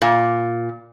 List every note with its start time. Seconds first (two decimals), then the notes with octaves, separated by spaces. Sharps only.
0.02 A#2